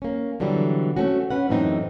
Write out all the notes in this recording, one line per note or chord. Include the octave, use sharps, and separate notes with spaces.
A#3 C#4
B2 D3 E3 F#3 G3
A3 C4 C#4 F#4
C#4 B4 F#5
F#2 A2 E3 F#3 C4 D#4